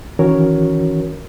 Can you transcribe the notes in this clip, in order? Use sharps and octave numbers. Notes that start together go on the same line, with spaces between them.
D#3 E3 C#4 F#4 A#4 C#5